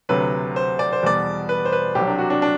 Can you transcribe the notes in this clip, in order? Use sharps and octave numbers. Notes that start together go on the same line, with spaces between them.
D2 C3 F#3 B4
C5
D5
C5
E2 B2 G3 D5
B4
C5
B4
C2 C3 F#3 G4
D4
F#4
D4
D4